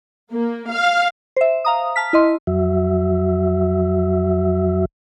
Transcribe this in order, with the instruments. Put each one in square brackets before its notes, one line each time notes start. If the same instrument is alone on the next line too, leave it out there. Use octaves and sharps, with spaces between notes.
[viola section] A#3
F5
[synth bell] C5 E5
F5 A#5 D#6
A5 F6 B6
E4 D#5 C6
[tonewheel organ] F2 F#3 F#4 E5